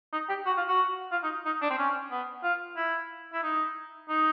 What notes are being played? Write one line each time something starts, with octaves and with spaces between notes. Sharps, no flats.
D#4
G4
F#4
F4
F#4
F4
D#4
D#4
D4
C4
C#4
B3
F4
E4
E4
D#4
D#4